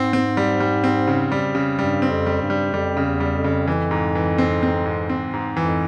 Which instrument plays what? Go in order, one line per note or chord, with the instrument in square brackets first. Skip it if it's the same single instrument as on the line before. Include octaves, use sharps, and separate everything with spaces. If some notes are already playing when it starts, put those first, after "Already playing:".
Already playing: [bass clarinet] G#2 [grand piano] C4
[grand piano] C4
G3
G3
C4
C#3
G3
C#3
[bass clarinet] G2 [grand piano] G3
[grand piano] C4
[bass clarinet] F2
[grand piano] G3
[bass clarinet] G2
[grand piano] G3
[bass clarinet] F2 [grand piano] G3
[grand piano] C#3
[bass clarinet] E2
[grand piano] G3
[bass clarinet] F2
[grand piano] C#3
[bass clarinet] F2 [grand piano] E3
[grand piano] G#2
E3
C4
C4
G#2
C4
G#2
[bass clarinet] F2 [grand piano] E3